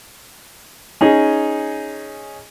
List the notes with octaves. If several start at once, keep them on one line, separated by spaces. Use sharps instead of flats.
C#4 D#4 G#4